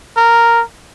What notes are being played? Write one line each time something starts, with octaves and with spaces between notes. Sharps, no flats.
A#4